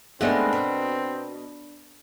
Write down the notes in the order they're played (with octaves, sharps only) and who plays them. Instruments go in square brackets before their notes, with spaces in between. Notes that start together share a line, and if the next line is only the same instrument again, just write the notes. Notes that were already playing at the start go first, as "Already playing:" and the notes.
[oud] G#3 A3 D#4 [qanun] B3 D4 A#4 [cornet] C4
[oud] B2